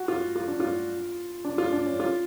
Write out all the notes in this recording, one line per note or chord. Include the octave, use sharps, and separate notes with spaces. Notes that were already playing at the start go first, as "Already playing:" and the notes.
Already playing: F#4
F4
F4
D4
F4
D4
F4
D4
C#4
F4